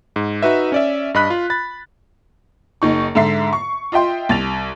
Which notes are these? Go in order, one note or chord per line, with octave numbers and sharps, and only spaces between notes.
G#2
D#4 F#4 B4 E5
C#4 D5 E5
G2 D#5 B5 F#6 B6
F4
B5 A6
F#1 D#4 C#6
G#2 D3 E5 C7
C#6
F4 D#5 E5 G5 C6
C2 A6 F7